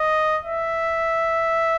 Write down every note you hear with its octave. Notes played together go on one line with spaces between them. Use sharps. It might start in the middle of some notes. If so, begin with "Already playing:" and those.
Already playing: D#5
E5